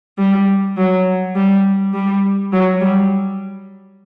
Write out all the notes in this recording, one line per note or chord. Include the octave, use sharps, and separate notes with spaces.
G3
F#3
G3
G3
F#3
G3